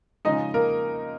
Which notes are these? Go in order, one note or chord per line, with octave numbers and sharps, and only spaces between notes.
C#3 F3 G#3 D#4 D#5
A#3 A#4